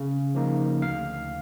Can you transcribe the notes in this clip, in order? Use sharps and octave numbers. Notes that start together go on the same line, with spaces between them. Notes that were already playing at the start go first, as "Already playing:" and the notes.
Already playing: C#3
F3 A#3 D#4
D2 F5